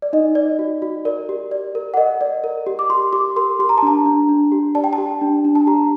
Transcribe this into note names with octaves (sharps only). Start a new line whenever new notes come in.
D5
D#4 D#5
D5
F#4
F#4
A#4 D5
G4
D5
A#4
F#5
A#4 D#5
D5
A#4
G4
D6
G4 C6
G4 D6
A#4 C6
G4 C6
A#5
A5
D4 A#5
D4
D4
G4
D5 A5
G5
A5
G4
D4
D4
A5
G4 A#5